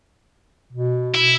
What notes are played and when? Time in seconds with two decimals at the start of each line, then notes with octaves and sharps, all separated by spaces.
0.73 B2
1.14 E4